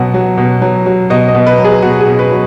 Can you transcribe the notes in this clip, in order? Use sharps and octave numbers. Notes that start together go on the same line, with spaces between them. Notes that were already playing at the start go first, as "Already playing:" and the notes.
Already playing: B2 F#3 F#5
F#3
B2
F#3
F#3
B2 D#5
D#5
B2
B4
F#3
G#4
B2 F#4
G#4
B2
B4
F#3